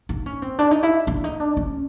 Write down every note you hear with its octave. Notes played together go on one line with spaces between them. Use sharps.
D#4
C#4
C4
D4
D#4
E4
D4
D#4
D4
C#4